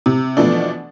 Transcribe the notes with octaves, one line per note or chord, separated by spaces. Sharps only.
C3
B2 E3 F3 A3 D4